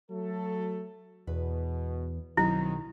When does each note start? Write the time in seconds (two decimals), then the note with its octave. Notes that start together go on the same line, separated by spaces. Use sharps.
0.10 F#3 A3 A4
1.27 E2 B2 B4
2.37 B1 D#3 F#3 C4 D#4 E4